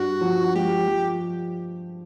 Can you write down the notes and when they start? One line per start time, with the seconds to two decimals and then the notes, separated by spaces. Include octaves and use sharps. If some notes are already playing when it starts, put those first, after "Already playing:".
Already playing: G2 F#4
0.21 F3
0.55 G#3 G4
0.88 F3